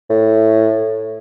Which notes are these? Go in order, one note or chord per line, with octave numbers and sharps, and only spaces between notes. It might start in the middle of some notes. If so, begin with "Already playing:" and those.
A2